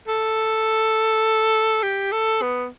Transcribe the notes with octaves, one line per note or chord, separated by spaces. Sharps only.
A4
G4
A4
B3